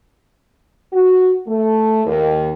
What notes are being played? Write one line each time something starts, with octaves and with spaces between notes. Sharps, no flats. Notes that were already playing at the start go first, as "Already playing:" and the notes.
F#4
A3
D#2